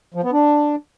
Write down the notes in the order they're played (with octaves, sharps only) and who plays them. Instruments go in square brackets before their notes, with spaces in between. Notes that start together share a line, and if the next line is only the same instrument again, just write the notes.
[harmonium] F3
B3
D4